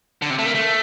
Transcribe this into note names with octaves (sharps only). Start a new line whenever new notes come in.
D3
C3
A3
A#3
A3